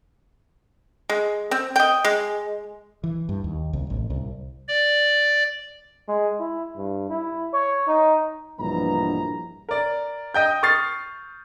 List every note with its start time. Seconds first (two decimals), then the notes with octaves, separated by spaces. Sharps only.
1.10 G#3
1.51 C4
1.76 D#5 G5
2.05 G#3
3.04 E3
3.29 G2
3.44 D#2
3.73 C2
3.90 A1
4.10 C2
4.68 D5
6.08 G#3
6.40 E4
6.77 G2
7.10 E4
7.53 C#5
7.87 D#4
8.60 A#1 G2 B2 E3 A#5
9.69 A#4 D5
10.34 D#5 G5 G6
10.63 C#6 D#6 F6 A6 C7